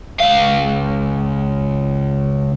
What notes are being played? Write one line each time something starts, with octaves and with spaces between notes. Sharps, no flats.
C#2 F5